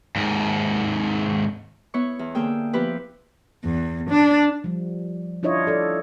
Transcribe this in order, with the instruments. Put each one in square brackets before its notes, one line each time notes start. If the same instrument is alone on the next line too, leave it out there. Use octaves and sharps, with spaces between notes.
[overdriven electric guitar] D#2 G#2
[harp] B3 E4 C#5 C#6
E2
D3 A#3 G#4 G5 E6
F3 B3 E4 G4 B4 C5
[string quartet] E2
D4
[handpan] F3 G3
D4 E4 F4 C#5 D#5
A4 D5